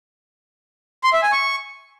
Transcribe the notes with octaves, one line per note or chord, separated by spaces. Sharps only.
C6
E5
G#5
C#6